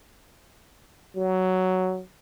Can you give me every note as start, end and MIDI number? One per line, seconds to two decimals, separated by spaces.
1.16 2.02 54